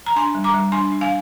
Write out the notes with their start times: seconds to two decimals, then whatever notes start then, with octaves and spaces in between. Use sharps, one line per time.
0.06 A#5
0.16 D4 G#5 C6
0.35 G3
0.44 A#5 D6
0.54 G3
0.72 D4 G#5 C6
0.92 D4
1.01 F5 G#5